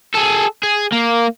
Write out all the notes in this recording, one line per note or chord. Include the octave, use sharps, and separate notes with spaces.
G#4 A4
G#4
A#3